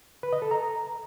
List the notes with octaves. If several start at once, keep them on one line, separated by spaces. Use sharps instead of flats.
B4
D#5
A4
A#5